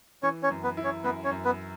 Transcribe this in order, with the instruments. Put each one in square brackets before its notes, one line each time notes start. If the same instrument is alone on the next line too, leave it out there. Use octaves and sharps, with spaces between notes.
[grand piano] E3 [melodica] C#4 C#5
[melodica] C#4 C#5
[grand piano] F#2
[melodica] B3 B4
[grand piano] E4
[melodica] C#4 C#5
[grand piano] F#2 [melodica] B3 B4
[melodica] C#4 C#5
[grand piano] F#2
[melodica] B3 B4